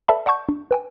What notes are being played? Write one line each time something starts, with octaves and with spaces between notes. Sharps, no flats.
A4 B4 D5 E5 A5 B5
D5 F#5 A5 C#6 G6
D4
B4 G5 G#5